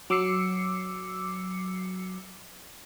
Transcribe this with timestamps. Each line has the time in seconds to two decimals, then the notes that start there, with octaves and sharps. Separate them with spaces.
0.10 F#3 D6 E6 C7 C#7